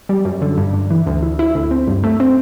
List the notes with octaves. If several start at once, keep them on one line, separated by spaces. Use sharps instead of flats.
G3
F#2
D3
G2
G2
E3
D2
E4
E4
D2
C4
G2
A3
C4